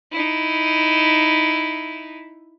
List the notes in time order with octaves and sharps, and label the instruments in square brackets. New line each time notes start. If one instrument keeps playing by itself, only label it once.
[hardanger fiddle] D#4 E4